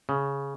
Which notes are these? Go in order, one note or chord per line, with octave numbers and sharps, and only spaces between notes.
C#3